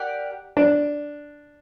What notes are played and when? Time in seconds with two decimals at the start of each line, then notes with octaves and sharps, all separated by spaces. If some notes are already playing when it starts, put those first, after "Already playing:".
Already playing: G4 A#4 D5 F#5
0.57 D4